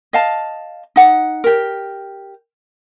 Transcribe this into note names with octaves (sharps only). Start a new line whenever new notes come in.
D#5 F5 A5
D#4 F#5
G4 A#4